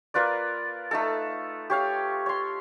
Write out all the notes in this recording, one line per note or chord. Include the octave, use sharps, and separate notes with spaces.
A#3 F4 B4 D5
A3 D#4 A4
G4 C#5 F5
C#5 C6